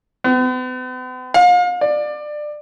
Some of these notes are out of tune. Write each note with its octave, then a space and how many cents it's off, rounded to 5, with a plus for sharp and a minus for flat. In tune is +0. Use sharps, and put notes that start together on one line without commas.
B3 +45
F5 +40
D5 +20